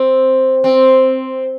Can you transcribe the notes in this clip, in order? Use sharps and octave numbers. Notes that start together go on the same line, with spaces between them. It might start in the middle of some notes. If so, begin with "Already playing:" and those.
Already playing: C4
C4